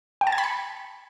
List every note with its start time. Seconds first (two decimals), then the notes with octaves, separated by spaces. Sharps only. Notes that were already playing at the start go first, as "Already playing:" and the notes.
0.21 G5
0.27 A5
0.32 G#6
0.38 B5
0.44 C#7